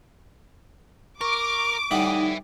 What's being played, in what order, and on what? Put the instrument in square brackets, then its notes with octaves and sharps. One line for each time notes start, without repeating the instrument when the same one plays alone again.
[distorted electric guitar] A#4 [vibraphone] C#6 [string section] D6
[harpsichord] A2 G3 F#5 [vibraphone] D#4 [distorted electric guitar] E5 G#5